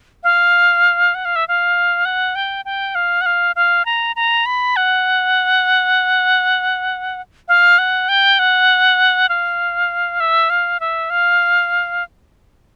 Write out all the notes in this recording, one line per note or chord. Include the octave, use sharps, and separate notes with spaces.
F5
F#5
F5
E5
F5
F#5
G5
G5
F5
F#5
F5
F5
A#5
A#5
B5
F#5
F5
F#5
G5
F#5
F5
E5
F5
E5
F5